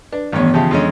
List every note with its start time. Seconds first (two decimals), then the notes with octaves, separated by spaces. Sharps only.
0.13 D4 B4
0.32 A1 G2 D#3 E3 B3 C#5
0.54 C#3 F3 G4 E5 A5 G6
0.71 F2 G#3 C#4 D4